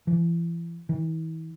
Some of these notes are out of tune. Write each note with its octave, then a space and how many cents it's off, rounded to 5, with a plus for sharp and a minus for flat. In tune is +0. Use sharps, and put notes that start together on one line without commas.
E3 +40
E3 -40